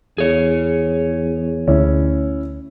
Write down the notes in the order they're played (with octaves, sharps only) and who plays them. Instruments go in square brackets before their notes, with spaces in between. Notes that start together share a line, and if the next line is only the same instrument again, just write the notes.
[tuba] E2 [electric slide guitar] G#4 C#5
[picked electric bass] D2 [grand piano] C#4 E4